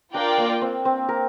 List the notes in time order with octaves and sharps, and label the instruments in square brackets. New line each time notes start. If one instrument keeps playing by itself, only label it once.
[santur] D4 [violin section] F4 A#4 D5 G5
[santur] A#3
C4
C4
A#4